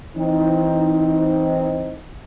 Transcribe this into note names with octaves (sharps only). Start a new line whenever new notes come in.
E3 C4 D#4